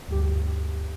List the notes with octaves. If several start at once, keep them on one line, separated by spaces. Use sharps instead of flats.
D2 G2 G4